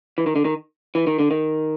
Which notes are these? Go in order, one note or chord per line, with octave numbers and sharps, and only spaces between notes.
E3
D#3
D3
D#3
E3
D#3
D3
D#3